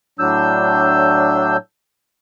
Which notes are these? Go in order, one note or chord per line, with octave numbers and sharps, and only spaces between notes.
A2 F#3 D4 E6 G6